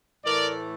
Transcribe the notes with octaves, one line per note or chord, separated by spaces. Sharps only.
A2 E3 A3 A#4 D5